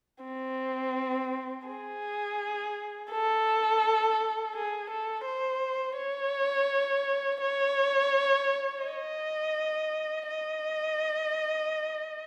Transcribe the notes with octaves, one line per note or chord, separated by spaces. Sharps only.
C4
G#4
A4
G#4
A4
C5
C#5
C#5
D#5
D#5